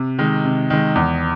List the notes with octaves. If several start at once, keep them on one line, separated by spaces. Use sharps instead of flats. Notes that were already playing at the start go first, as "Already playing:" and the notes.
Already playing: C3
D#3 G#3
C3
D#3 G#3
E2